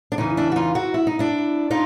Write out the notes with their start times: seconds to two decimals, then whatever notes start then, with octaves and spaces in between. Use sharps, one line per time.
0.12 D4
0.18 E2 C#3 E3 D#4
0.37 D4 E4
0.52 F#4
0.56 D#4 F4
0.75 E4 F#4
0.94 E4
1.07 D#4
1.19 D4 E4
1.70 D4 D#4 F4